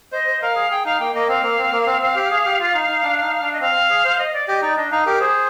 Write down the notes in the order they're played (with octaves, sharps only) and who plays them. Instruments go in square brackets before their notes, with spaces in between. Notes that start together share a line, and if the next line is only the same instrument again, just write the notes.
[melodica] C5 [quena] D#5
[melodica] C5
[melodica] A#4 [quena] F5
[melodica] G#4
[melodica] G#4 [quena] G5
[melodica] D#4 [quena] F5
[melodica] A#3 [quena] G5
[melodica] A#3 [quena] D#5
[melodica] C4 [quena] F5
[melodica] A#3
C4
A#3
C4
C4
G4
G#4
G4
F4
D#4
D#4
D4
D#4
D4
[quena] D#5
[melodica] C4 [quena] F5
[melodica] C4
G#4
C5
[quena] D#5
D5
[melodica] G4 [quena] D#5
[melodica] D#4 [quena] D5
[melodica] D4 [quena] D#5
[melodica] D#4 [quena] F5
[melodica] G4 [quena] A#4
[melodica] G#4 [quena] C5